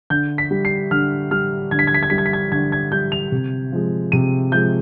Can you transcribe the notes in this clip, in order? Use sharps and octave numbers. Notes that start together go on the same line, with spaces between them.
D3 G6
B6
G3
C7
D3 F6
G3 F6
D3 G#6
B6
G#6
B6
G#6
G3 B6
G#6
B6
G#6
D3 G#6
G#6
G3 G6
F7
C3
F3 G#3
C3 D#7
F3 G#3 G6